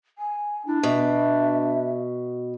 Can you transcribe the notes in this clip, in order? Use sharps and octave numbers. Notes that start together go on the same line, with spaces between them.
G#5
D4 E4
B2 E5